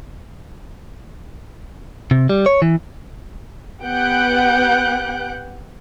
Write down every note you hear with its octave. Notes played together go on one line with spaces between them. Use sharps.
C3
G3
C#5
E3
B3 G4 F#5 F#6 G6 D7